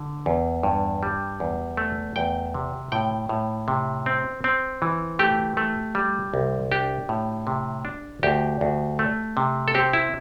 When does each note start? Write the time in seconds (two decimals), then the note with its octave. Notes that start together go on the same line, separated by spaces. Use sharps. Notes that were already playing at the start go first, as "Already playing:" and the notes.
Already playing: D3
0.26 E2
0.63 G2
1.03 G3
1.40 E2
1.77 A3
2.16 E2 G5
2.54 C3
2.92 A2 G5
3.29 A2
3.68 C3
4.06 C4
4.44 C4
4.82 E3
5.19 A3 G4
5.57 A3
5.95 G3
6.34 C2
6.72 D4 G4
7.09 A2
7.47 C3
7.85 D4
8.23 D2 G4
8.61 D2
8.99 A3
9.37 C3
9.68 A4
9.74 C4 G4
9.93 E4